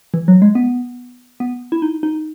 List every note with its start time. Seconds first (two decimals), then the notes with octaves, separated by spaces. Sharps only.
0.14 E3
0.28 F#3
0.42 G#3
0.55 B3
1.40 B3
1.72 E4
1.82 D#4
2.03 D#4